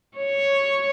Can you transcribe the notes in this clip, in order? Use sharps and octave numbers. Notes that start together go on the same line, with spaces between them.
C#5